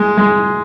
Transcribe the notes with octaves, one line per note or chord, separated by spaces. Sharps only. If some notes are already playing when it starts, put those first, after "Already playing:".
Already playing: G#3
G#3